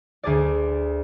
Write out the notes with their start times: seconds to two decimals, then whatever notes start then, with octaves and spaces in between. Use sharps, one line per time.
0.23 D2 G#4 D5